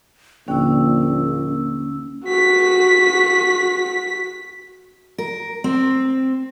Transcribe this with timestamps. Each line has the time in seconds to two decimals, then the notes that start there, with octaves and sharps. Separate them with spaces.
0.48 A#1 D#2 D3 A#3 C#4 G5 E6
2.25 F#4 B6
5.18 A#4
5.64 C4